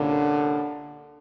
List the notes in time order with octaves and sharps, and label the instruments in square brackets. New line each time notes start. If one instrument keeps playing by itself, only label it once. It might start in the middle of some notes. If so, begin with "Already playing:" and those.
Already playing: [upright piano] C2 A#2 G3 A#3 C#4 [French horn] D3